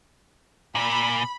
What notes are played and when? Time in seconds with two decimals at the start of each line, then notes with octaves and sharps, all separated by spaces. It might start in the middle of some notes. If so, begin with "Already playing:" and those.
0.75 A#2 B5